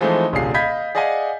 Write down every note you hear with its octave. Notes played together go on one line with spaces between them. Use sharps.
E3 F3 G#3 A3 C4 D#4
D#1 C2 D3 F4 G#4 C7
D#5 F5 B5 G6 G#6 B6
G#4 D5 D#5 F5 F#5 G#5